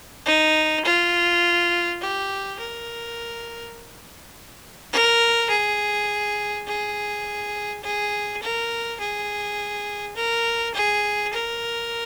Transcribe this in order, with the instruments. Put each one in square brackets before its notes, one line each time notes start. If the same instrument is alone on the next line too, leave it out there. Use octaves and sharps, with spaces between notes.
[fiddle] D#4
F4
G4
A#4
A#4
G#4
G#4
G#4
A#4
G#4
A#4
G#4
A#4